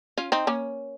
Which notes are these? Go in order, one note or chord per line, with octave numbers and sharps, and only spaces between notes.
C#4 F4
C4 D#4
A#3 C#4